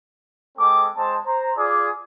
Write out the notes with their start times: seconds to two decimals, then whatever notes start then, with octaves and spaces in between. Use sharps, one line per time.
0.58 G#3 C4 A4 G5 D6
0.97 G#3 C4 C5 A5
1.26 C5 A#5
1.57 F4 G#4 D5